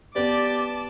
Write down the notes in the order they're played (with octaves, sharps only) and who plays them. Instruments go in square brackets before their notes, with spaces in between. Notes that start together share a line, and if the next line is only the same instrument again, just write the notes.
[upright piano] B3 B4 [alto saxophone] G4 [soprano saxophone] D5 [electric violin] A5 D6